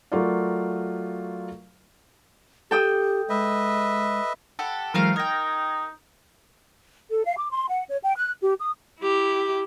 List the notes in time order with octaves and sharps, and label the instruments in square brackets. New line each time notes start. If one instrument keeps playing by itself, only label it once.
[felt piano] F#3 A3 F4 A#4 D5 F5
[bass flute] G4 [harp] A4 G5 D#6
[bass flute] G#3 [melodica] B4 D#5 E5
[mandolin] G4 A4 F#5
[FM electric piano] E3 F#3 G#3 [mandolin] A3 C4 F5 [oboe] A#4
[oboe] D#4 [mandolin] A#4 G5 [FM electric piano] F6 G#6 A#6
[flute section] A4
F5
D6
C6
F#5
C#5
G5
F#6
G4
D#6
[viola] E4 G4